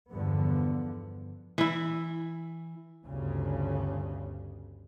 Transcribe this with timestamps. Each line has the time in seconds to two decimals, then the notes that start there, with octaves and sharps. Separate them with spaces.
0.11 E2 G2 D3 F3 B3
1.58 E3 E4
3.05 G1 D2 C#3